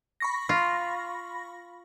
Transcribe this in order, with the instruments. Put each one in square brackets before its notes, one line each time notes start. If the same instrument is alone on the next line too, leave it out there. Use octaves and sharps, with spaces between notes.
[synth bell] B5 C#6 A#6
[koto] F4